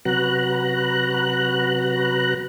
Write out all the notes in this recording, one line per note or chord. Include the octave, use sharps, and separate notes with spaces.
C3 F#3 F#4 B4 A#5 F#6